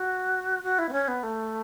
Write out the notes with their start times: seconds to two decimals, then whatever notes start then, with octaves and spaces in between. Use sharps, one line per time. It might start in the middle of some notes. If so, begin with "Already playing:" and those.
Already playing: F#4
0.64 F#4
0.79 E4
0.89 B3
0.93 C#4
1.08 B3
1.23 A3